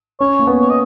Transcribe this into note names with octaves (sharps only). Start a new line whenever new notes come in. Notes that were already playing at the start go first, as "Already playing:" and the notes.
C#4 C#5
A#3
B3
C#5
D#5